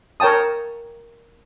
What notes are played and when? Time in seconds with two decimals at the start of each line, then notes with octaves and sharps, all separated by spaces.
0.20 A#4 C#5 G5 A5 D#6